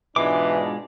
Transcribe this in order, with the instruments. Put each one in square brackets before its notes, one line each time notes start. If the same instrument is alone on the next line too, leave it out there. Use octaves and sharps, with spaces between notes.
[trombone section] G#2 B2 D4 [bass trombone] E3 [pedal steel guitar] G#3 F4 D6